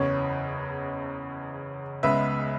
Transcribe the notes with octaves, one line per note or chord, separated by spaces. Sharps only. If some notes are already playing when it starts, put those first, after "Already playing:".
Already playing: F#1 E2 C#3 C#5
C#2 C#3 G#3 B3 B4 E5